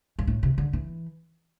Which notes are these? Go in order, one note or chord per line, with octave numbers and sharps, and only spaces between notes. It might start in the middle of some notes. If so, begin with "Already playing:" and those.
G2
A2
C3
D3
E3